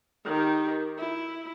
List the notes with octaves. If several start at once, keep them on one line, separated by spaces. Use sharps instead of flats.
D#3 G4
E4